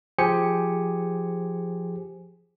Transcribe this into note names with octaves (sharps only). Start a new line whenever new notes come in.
F3 G4 G#4 C5 G#5 C#7